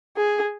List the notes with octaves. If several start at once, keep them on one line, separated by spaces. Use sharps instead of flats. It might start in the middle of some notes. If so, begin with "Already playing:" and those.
G#4